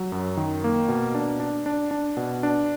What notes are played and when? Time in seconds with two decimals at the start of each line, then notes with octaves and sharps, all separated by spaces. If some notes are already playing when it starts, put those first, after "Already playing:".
Already playing: F#3
0.12 F#2
0.37 D#3
0.64 A#3
0.88 B2
1.15 D4
1.40 D4
1.66 D4
1.91 D4
2.17 B2
2.43 D4